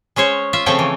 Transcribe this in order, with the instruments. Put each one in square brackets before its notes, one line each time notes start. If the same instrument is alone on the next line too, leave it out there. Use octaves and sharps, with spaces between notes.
[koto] G#3 C#4 C5 C#5
F4 E5
C#3 F3 A3 C4 C#5 G5
E3